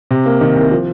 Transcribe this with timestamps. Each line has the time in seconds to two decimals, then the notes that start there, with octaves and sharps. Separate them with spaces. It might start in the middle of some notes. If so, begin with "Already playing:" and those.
0.11 C3
0.26 A#3
0.41 D#3
0.56 C2
0.72 F3